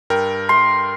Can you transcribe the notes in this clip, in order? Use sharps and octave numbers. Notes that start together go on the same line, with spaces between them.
G2 A#4 G5
C6